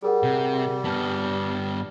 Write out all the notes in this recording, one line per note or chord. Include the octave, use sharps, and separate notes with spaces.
G3 G#4 A#4 F#5
C3
G2 B3 A5 F6